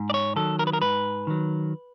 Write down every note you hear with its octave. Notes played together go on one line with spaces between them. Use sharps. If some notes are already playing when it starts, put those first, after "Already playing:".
Already playing: G#2
D5
C#5
D#3 F#3 A4
A#4
B4
A#4
G#2 B4
D#3 F#3